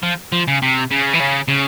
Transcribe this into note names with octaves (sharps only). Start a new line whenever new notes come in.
F3
F3
C#3
C3
C#3
E3
C#3
C#3